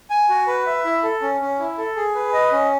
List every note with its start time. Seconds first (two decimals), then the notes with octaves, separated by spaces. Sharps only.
0.10 G#5
0.30 F#4
0.47 B4
0.66 E5
0.85 E4
1.03 A4
1.22 C#4
1.41 C#4
1.59 E4
1.78 A4
1.96 G#4
2.15 B4
2.33 D#5
2.52 C#4